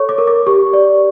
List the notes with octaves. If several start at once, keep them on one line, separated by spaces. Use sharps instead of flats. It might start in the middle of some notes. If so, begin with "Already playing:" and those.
Already playing: A4 C#5 C#6
D6
A#4
D6
G4 C#6
D5